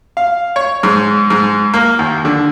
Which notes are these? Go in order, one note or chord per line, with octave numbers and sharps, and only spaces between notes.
F5
C#5
G#2
G#2
A#3
D#2
D3